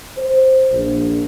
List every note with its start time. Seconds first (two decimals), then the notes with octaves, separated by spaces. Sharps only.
0.17 C5
0.71 A#1